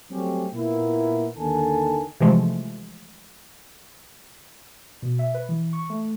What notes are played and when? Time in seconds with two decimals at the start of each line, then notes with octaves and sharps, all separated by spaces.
0.11 F#3 G3 A3 C4 C#4 G4
0.53 A#2 A#3 B3 E4
1.37 D#2 D3 D#3 A4 G#5 A5
2.20 C3 E3 F3 G#3 A3
5.02 B2
5.19 E5
5.34 B4
5.49 E3
5.73 C#6
5.90 A3